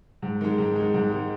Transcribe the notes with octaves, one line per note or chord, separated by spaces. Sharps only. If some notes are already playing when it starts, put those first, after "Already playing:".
G#2
D#3 G#3
G#2
D#3 G#3
G#2
D#3 G#3